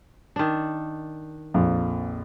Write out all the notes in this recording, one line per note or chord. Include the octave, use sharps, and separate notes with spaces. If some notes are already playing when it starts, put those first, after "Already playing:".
D#3 D4
A#1 F2